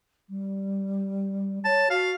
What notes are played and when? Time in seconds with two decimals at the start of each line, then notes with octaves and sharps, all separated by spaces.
0.30 G3
1.65 C#5 A5
1.90 F#4 F5